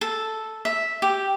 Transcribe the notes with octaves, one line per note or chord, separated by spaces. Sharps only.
A4
E5
G4